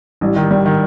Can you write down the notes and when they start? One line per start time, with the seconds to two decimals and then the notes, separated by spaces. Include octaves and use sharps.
0.21 A1 G3
0.36 D#3
0.51 G3
0.66 D#3